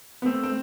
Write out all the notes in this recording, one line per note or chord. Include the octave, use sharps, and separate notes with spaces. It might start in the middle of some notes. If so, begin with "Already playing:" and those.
B3
A3 C4
C4